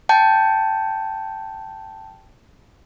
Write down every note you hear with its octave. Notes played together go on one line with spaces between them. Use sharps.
G5 A5 G6